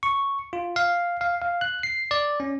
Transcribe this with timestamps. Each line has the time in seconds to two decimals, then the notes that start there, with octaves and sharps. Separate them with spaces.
0.03 C#6
0.53 F4
0.76 F5
1.21 F5
1.42 F5
1.61 F#6
1.83 C7
2.11 D5
2.40 C#4